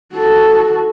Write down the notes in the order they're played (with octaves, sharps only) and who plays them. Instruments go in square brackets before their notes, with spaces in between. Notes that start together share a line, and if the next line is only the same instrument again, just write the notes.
[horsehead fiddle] F#4 A4